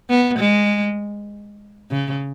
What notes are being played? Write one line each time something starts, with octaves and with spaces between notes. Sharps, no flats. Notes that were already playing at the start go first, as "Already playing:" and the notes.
B3
G#3
C#3